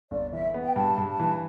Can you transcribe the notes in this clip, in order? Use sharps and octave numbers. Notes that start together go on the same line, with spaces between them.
G1 D5
E3 E5
B3
G5
G2 A5
G2
A5
E3